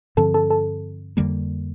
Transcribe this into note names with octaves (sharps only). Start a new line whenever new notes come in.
G2 D3 F3 C4 A4 A5
A4 A5
A4 A5
F2 D3 G3 A#3